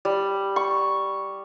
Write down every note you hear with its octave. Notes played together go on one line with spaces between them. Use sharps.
G3
C#6